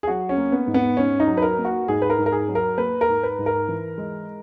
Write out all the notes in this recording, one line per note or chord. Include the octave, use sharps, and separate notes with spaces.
G#4
F#3 F#4
C#4
A#3
B3
G#2
B3
G#2 C#4
D#4
F#3
B4
A#4
A#3
F#4
G#2 G#4
B4
A#4
G#2
A#4
G#4
F#3
A#4
A#3 B4
A#4
G#2
B4
G#2
A#4
E3
G#3